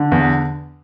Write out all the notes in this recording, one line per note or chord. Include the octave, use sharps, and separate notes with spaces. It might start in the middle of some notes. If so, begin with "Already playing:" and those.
Already playing: D3
E2